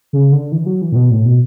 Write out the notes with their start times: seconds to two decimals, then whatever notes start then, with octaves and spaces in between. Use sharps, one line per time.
0.13 C#3
0.32 D3
0.52 E3
0.66 F#3
0.82 E3
0.92 A2
0.96 B2
1.11 A2
1.26 B2